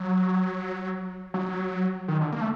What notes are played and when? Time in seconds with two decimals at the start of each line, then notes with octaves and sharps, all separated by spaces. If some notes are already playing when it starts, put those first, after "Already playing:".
Already playing: F#3
1.34 F#3
2.08 D#3
2.21 D3
2.32 A#3
2.41 A3